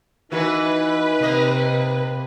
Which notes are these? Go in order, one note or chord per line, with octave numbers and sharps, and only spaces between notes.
E3 D#4 F#4 B4
C3 A#3 D#5